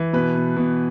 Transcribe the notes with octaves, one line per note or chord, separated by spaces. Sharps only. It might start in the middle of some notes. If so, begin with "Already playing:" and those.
Already playing: E3
B2 B4
B2
B2